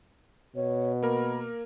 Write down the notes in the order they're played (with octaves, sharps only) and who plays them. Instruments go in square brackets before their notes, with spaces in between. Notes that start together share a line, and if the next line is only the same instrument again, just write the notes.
[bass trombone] B2 [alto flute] C#5
[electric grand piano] A#3 A#4 [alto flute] B5